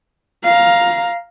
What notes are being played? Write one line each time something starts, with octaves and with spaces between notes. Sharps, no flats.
F5 A#5